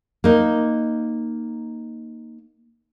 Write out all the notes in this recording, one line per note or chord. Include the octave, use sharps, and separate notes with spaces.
A#3 D#4